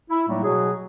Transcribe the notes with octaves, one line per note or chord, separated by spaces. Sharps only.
E4
A2 F#3 G3 A3 A#3 D#4
B2 F#3 G#4